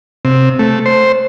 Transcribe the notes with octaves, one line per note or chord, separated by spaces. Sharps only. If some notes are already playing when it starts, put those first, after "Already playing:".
C3
A3
C5